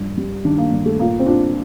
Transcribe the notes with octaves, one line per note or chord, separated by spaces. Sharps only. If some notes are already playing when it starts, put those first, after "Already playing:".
Already playing: G2 F3
G3
D#3 D4
A#3
G2
A3
A#2 A#3
C4
A#2 D4